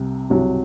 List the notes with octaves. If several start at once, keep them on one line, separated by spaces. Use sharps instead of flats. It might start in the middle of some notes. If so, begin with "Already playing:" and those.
Already playing: C2 C3
C2 C3 F#3